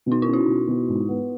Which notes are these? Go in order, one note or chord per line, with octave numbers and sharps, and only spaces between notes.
B2
D#4
C#4 E4
F#4
B2
B2
G#2
B3